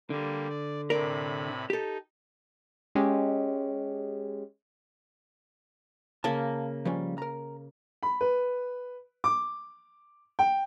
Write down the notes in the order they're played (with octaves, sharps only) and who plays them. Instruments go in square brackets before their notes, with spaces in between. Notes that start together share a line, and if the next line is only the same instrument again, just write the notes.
[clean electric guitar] D3 [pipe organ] G3 A#3
[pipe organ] D5
[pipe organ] A2 C3 B5 [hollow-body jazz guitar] A#4 D5
[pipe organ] D#4 [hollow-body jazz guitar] G4 A4
[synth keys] G#3 C#4 G4
[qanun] C#3 A#3 [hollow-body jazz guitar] A5
[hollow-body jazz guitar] F3 G3 C#4
A#4 A#5
[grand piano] B5
B4
D6
G5